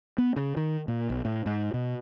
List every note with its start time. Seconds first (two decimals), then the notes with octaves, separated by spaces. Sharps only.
0.18 B3
0.36 C#3
0.57 D#3
0.88 A#2
1.10 B1
1.25 A2
1.46 G#2
1.74 B2